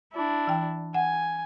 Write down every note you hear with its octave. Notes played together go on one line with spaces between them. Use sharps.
D4 E4
E3 G5
F#5 G#5